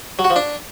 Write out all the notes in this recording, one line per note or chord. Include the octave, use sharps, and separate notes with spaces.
F#3
F#4
F3
D4